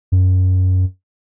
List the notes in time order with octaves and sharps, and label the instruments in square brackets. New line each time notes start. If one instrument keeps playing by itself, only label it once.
[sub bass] F#2